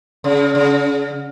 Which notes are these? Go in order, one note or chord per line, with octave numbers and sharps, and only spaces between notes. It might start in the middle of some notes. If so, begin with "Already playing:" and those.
C#3
C#3